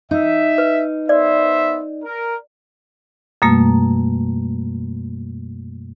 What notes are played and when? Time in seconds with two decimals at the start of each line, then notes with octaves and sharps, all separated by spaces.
0.11 D#4 E5
0.58 B4
1.09 B3 C5 D5 E5
2.04 A#4
3.42 F#2 B2 G3 A3 A#3